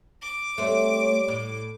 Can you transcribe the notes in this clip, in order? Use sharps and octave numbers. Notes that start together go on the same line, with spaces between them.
D6
G3 A3 C4 C#5
A2